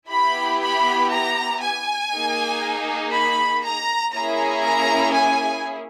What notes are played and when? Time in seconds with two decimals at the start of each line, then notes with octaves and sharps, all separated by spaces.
0.11 B3 E4 G4 B5
0.61 B5
1.11 A#5
1.61 G#5
2.12 A#3 D#4 G#4
3.13 B5
3.64 A#5
4.14 A#3 C#4 E4 G#4 A#5
4.64 A#5
5.14 G#5